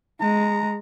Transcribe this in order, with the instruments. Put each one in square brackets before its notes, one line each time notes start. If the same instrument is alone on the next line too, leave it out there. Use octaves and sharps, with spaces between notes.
[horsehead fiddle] G#3 [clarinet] A#5